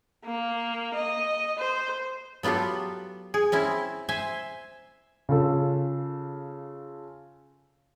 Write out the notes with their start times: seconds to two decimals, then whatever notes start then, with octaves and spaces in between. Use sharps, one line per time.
0.24 A#3
0.94 D#5
1.59 C5
2.43 F#3 B3 F4 G4 A4
3.34 G#4
3.52 C4 C#4 E4
4.09 C5 E5 G#5
5.29 C#3 F4 A4